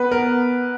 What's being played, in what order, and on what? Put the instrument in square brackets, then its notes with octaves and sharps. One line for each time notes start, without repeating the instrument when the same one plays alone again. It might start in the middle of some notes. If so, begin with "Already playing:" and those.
Already playing: [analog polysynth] B3 [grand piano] B4 F#5
[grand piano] A#4